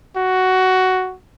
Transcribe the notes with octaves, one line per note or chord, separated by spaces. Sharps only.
F#4